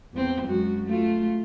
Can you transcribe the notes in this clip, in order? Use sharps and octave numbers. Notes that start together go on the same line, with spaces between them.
E2 C4
F#2 G#3 F#4
A3 F4